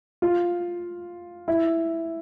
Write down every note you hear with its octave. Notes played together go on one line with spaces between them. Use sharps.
F4
E4